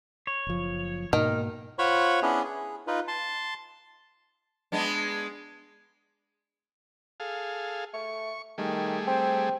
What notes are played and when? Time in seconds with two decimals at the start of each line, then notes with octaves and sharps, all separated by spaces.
0.27 C#5
0.47 F#1 F3
1.13 G#2 B2 D#3 A#3 F6
1.79 F4 C5 C#5 F#5 B5 C#6
2.22 B3 C#4 D4 E4 G#4
2.44 G#4
2.87 D#4 F4 B4
3.08 A5 C6
4.72 G#3 B3 D4
7.20 G#4 A4 F5
7.94 A3 C#6
8.58 D#3 G3 A3 G#4
9.07 C4